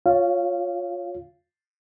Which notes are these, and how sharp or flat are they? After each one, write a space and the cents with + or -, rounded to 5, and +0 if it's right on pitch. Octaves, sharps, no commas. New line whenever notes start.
F4 +15 C#5 +0 F5 -15